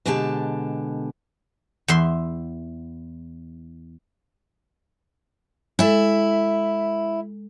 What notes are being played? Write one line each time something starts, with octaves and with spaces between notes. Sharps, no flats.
B2 D3 G#3 G4 D#5 A5
E2 E5 C6
G#3 E4 A4 E5